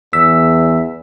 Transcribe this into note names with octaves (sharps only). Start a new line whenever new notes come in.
E2 E6 B6